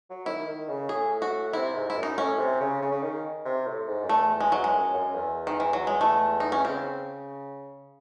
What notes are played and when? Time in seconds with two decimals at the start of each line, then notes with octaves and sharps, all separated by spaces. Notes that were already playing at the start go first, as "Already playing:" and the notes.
0.10 F#3
0.26 D#3 E4
0.47 D#3
0.68 C#3
0.89 A2 G#4
1.22 F#4
1.53 C3 E4
1.75 G#2
1.90 E4
1.96 F#2
2.03 D#4
2.17 A2 C#4
2.38 C3
2.60 C#3
2.81 C#3
2.92 C#3
3.02 D#3
3.45 C3
3.67 A2
3.87 G#2
4.03 F#2
4.09 E2 A3
4.40 G#3
4.52 F#3
4.64 G#3
4.73 F#2
4.94 F#2
5.15 E2
5.47 D#3
5.60 E3
5.73 F#3
5.87 G#3
6.01 A3
6.40 D#4
6.52 C#4
6.65 C#3 C4